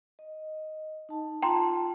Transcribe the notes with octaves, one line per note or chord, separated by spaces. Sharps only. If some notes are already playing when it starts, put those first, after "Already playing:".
D#5
D#4 A5
F4 G5 A5 A#5 C6